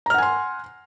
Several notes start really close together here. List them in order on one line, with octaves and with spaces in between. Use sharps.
A#5 F6 F#5 G#5 C6